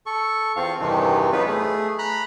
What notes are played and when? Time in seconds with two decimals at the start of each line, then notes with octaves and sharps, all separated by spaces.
0.06 A4 C#6
0.56 E2 C4 F4 F5 C#6
0.80 E2 G2 C3 D#3 E3
1.32 F#3 B3 D#4 F4 B4
1.46 A3 G#4
1.98 A#5 B5 F#6